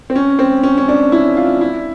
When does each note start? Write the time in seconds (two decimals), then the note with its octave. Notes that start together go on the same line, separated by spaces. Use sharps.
0.10 C4
0.16 C#4
0.39 C4
0.63 C#4
0.78 C#4
0.88 D4
1.12 E4
1.37 F4
1.61 E4